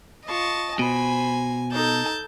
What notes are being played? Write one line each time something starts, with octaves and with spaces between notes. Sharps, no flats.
F4 D#5 A5 C#6
B2 C5 G#5 B5
D#4 A4 A5 G6